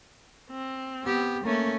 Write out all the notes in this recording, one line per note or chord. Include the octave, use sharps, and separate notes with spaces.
C4
B3 G4
A3 A#3 C#4